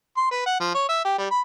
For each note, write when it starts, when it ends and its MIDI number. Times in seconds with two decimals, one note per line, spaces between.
0.17 0.28 84
0.31 0.44 71
0.46 0.56 78
0.60 0.75 53
0.75 0.85 73
0.89 1.01 76
1.05 1.14 67
1.18 1.29 55
1.31 1.41 83